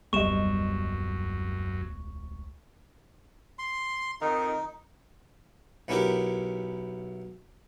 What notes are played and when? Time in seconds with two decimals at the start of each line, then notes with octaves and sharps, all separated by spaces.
0.13 D#1 C2 F#2 G3 B3 D#5 C#6 E7
3.59 C6
4.21 F2 D#3 D#4
5.88 B1 B3 C#4 E4 G4 A#4